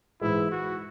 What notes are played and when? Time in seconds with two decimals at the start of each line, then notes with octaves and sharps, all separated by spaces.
0.21 G#2 E3 G#3 E4
0.51 F#4